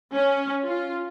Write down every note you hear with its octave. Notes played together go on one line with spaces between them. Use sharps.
C#4
F4